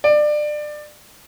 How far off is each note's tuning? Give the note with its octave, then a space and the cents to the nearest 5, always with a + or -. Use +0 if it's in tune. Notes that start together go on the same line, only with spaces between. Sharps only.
D5 +25